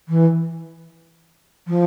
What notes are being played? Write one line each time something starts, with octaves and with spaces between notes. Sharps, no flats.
E3
F3